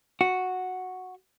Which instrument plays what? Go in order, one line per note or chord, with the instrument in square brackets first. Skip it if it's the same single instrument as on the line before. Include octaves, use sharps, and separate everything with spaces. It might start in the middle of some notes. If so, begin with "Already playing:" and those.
[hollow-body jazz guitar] F#4